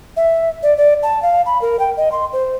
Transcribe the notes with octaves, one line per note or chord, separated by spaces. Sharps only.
E5
D5
D5
A5
F5
B5
A#4
G5
D#5
C6
C5